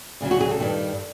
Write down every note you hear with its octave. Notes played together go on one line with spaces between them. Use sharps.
D2 C#3 F#3
F#4
G#4
A4
G2 D#3 G3